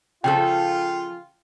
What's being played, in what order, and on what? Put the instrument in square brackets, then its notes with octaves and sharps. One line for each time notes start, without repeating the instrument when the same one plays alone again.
[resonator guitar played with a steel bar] C#3 F3 A4 [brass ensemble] F4 [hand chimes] G5